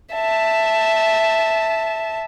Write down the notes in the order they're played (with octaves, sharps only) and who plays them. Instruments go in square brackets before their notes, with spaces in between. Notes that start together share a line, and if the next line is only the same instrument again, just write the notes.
[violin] E5 A5